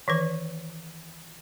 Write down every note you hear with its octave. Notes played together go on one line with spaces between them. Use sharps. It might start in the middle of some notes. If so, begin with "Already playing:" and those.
D#3 E3 B4